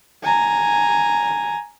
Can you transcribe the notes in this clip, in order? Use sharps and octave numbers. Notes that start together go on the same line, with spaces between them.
G#5 A#5